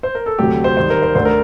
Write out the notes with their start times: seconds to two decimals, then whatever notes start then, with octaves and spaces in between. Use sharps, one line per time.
0.03 C5
0.15 A#4
0.26 A4
0.39 D2 C3 F#3 A3 G4
0.64 C5
0.77 D#2 D#3 G3 C5
0.90 A#4
1.02 C5
1.15 D2 D3 A3 C5
1.25 A#4